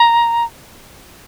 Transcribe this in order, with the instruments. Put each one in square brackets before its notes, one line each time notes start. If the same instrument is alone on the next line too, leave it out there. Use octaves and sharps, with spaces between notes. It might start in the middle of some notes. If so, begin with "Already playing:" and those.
Already playing: [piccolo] A#5